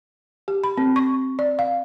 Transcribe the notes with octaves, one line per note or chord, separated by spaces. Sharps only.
G4
B5
C4
C#6
D5
F5